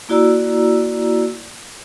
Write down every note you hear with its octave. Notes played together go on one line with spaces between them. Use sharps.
A#3 E4 F#4 D5 A#5 E6